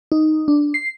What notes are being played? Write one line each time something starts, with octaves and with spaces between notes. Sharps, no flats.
D#4
D4
C7